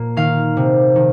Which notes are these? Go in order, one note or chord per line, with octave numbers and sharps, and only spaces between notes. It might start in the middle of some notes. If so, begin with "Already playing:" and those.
Already playing: A#2 A#3
D#3 F5
C3
D#3